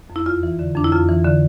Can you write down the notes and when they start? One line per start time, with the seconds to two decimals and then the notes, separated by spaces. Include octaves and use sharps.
0.10 F2
0.16 E4
0.26 E2 F4
0.43 E3
0.59 D3
0.76 F2 D4
0.84 E4
0.92 F2 F4
1.09 E3
1.25 D3